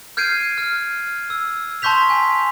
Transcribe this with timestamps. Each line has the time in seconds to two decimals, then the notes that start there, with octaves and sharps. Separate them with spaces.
0.17 F6 G6 G#6 C7 D7 D#7
0.58 F6
1.30 E6
1.82 A5 C6 C#6 G6 B6 F7
2.10 G#5